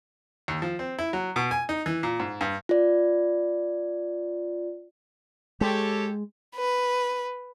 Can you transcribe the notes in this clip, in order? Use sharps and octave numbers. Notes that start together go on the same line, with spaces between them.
D#2
F3
C4
E4
F#3
B2
G#5
D#4
E3
A#2
G#2
G2
F4 D5
G#3 G4 A4 C#5
B4